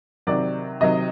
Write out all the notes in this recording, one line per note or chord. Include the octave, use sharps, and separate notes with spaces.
C3 D#3 F#3 D5
C3 D#3 F#3 D#5